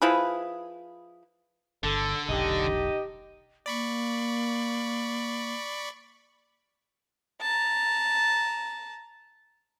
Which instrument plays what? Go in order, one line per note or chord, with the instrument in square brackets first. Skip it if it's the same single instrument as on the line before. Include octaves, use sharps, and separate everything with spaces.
[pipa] F3 E4 G#4 B4
[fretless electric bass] G1 [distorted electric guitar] D3 [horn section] A4
[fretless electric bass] F1 B1 [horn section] D#4 D#5 [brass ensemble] G4
[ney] A#3 [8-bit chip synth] D5 B5 C#6
[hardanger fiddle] A5 A#5